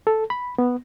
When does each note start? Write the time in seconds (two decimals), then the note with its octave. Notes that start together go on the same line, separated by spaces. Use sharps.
0.07 A4
0.30 B5
0.58 B3